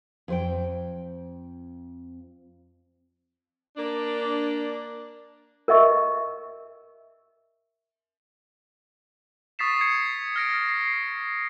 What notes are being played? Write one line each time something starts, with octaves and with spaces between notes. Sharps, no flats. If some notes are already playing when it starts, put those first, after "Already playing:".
F2 C5 G5
A#3 D4
A#4 D#5 E5 C#6
C#6 D#6 A6 B6 C7 E7
G#6 C7 C#7
F6 A#6 D7
C7